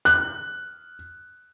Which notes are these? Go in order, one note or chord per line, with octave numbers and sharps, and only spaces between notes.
F#6